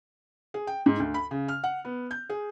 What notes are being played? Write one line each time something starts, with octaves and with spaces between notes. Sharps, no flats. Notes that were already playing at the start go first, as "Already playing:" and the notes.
G#4
G5
G#2
D2
B5
C#3
F6
F#5
B3
G6
G#4